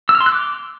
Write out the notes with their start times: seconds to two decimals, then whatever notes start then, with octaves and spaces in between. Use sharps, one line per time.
0.09 E6
0.15 F6
0.21 C6
0.26 F#6
0.32 D6